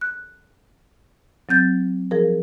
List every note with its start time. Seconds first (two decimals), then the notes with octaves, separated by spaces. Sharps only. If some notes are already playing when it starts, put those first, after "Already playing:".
0.01 F#6
1.49 F#3 C4 G6 A6
2.11 F3 G#4 A#4